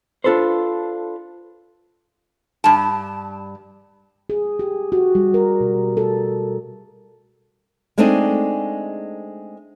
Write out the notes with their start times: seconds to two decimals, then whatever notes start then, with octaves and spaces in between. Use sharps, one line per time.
0.24 D4 F4 A4 B4 C5
2.64 G2 A5
4.30 G#4
4.59 G4
4.92 F#4
5.15 G3
5.34 A#4
5.61 B2
5.97 A4
7.98 G#3 A3 C4 D4 D#4 G#4